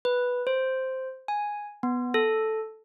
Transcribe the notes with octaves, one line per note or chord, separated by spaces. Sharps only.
B4
C5
G#5
B3
A4